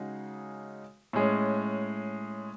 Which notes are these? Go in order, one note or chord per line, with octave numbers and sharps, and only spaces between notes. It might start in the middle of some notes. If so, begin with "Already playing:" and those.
Already playing: C#3 G#3 D#4 F#4
A2 G#3 C#4